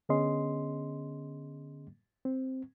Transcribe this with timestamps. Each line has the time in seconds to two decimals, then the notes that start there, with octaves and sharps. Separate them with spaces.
0.09 D3 B3 C#4 G#4 D#5 C6
2.25 C4